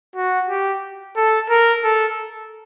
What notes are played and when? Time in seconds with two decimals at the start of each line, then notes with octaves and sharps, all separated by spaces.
0.16 F#4
0.49 G4
1.16 A4
1.50 A#4
1.84 A4